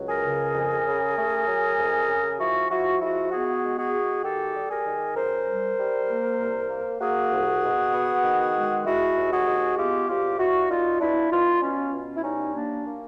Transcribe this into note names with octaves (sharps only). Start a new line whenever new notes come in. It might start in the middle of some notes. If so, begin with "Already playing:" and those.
Already playing: C#2 F#3
G#4 A#4
C#3
F2
C#3
A3
F#3
F2
C#3
F3 E4 F#4
F3 E4 F#4
G#3 E4 F#4
B3 F#4 G#4
G#3
F#4 G#4
G#3
D#3 G4 A4
G3
G#4 A#4
D#3
F#2 A#4 C5
G3
G3
A#3
C2
A#3
A#3 F#4 G#4
C2
B2
B3
D#3
G#3
G#3 E4 F#4
D#2
F#4 G#4
G#3
B3 F4 G4
C2 F4 G4
C2 E4 F#4
A#2 D#4 F4
B3 D4 E4
B3 D#4 F4
B2 C#4
B2
E4
G3 C#4 D#4
A#3 D4
A#3